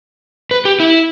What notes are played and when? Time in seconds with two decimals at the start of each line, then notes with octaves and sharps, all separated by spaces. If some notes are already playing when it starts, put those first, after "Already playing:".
0.51 B4
0.65 G4
0.80 E4